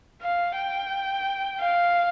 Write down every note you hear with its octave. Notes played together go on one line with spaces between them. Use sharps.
F5
G5
F5